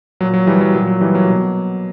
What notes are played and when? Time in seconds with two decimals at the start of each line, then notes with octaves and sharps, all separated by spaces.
0.21 A#2 F#3
0.34 F#3
0.47 E3 G3
0.61 F#3
0.74 A#2 F#3
0.87 F#3
1.01 E3 G3
1.14 F#3 A#3
1.28 B2